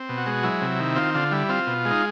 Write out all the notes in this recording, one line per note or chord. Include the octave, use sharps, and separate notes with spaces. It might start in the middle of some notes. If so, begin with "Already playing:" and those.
Already playing: C4
B2
F#4
G#3
F#3 E4
C3
D#3
C4 F4
D3 F4
G3 E4
C4 F4
B2
G#3
D#4